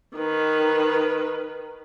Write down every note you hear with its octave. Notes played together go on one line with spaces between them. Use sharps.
D#3 B4